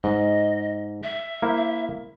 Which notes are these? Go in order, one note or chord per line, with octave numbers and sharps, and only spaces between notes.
G#2 D#5
E5
A#3 E4 C5